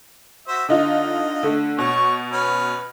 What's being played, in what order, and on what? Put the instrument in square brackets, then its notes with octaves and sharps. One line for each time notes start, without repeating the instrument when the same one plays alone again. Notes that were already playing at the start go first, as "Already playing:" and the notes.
[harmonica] F#4 C5 E5
[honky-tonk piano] D3 D#4 F4 [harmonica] D#5
[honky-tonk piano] D3 A3
[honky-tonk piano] B2 [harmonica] C#5 C#6
[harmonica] C#4 B4 F6